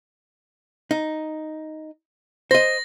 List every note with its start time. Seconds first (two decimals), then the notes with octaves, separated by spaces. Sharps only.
0.91 D#4
2.51 C5 D#5 A#6